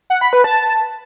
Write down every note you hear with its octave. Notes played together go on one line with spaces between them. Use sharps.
F#5
B5
B4
A5